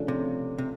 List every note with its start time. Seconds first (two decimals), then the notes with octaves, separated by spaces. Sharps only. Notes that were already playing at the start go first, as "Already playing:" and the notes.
Already playing: C#3 F3 A3 D4
0.08 C3
0.58 C3